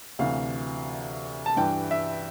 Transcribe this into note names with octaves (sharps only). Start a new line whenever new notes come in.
D2 C3 E3 F5
A5
G2 E3 G3 G5
E5